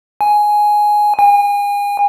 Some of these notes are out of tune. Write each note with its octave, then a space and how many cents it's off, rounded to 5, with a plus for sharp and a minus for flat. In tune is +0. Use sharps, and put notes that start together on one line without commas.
G#5 +5
G#5 -35